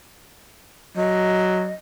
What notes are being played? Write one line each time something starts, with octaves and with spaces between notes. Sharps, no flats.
F#3 D#5